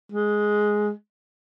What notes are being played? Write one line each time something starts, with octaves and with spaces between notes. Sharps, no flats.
G#3